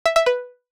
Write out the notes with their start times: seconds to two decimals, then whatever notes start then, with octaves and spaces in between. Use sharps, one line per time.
0.06 E5
0.16 E5
0.26 B4